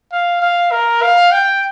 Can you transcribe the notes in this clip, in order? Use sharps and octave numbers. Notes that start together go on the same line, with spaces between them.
F5
F5
A#4
F5
G5